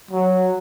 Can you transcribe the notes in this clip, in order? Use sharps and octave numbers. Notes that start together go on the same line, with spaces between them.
F#3